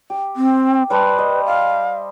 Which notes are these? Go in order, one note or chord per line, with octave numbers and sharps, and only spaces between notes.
G4
C4
G3 B4 C5 A5
D#5
F5